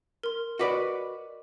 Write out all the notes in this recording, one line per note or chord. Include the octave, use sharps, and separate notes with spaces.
A#4 C6
F#4 B4 D5 D#5 D6 B6